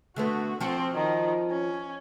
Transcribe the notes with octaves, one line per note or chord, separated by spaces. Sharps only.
D3 A3 B3 F#4
F3 C4 F4 F#4
D#3
C#4